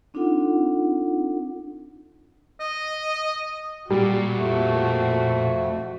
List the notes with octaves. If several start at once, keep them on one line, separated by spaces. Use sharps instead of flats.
C4 D4 D#4 F4 A4 F#5
D#5
A#2 G3 F#4
F2 A3